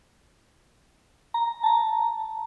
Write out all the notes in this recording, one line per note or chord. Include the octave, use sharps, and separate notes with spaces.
A#5
A5 A#5